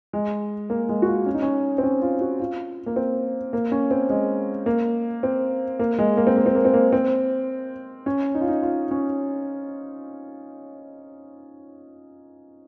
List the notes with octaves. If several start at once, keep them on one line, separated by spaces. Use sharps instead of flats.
G#3
A#3
G#3
F#4
F4
C#4
D#4
C#4
C4
C#4
F4
F#4
F4
A#3
C4
A#3
C#4
C4
G#3
A#3
C4
A#3
G#3
A#3
C4
A#3
C4
A#3
C4
A#3
C4
C#4
D#4
F4
D#4
F4
C#4